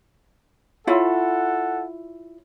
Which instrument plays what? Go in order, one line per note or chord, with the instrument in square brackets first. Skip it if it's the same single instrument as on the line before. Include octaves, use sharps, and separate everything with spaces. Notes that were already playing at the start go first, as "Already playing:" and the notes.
[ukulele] E4 F4 C#5 [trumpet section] A4 F#5